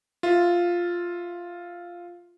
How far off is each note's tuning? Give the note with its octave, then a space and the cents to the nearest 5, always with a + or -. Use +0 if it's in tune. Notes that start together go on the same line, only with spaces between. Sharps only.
F4 +0 E5 +10